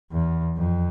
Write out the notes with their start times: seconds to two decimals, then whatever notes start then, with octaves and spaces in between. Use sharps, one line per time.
0.12 E2
0.57 F2